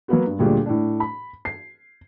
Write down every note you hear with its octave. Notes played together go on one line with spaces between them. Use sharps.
F#3 A#3 B3 F#4
G2
D2 A#2 G3 G#3
A2 D4
B5
C7